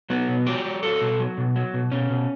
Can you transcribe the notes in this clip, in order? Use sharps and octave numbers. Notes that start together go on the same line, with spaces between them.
F#3 B3
B2
F#3 G4
F#3
F#3 A4
B2
F#3
B2
F#3
B2
B2 C#4
B2